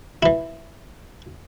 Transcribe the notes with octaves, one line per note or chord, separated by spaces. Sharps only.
E3 E4